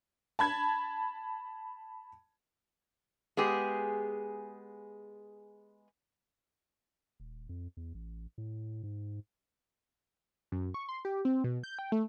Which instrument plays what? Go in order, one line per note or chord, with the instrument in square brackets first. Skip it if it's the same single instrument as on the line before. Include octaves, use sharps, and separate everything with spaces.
[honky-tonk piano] A5 B5 G#6
[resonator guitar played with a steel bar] G#3 B3 G4 G#4
[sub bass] D#1
F2
E2
A1
A2
G#2
[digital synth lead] F#2
C#6
C6
G4
C4
B2
G6
G5
A3